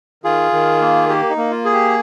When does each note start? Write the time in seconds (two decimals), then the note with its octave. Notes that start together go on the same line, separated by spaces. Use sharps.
0.24 D#3 F4 G#4
0.52 D#3
0.81 A#3
1.09 A#3 G4
1.30 D#4
1.37 A#3
1.51 F4
1.65 G#4
1.73 G4